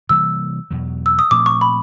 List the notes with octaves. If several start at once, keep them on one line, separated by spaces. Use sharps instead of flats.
C3 E3 G3 A#3 E6
E2 B2 F#3
E6
D#6
A#2 F3 A3 C4 D6
C#6
B5